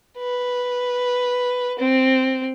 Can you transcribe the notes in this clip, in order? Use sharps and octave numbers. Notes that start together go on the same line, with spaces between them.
B4
C4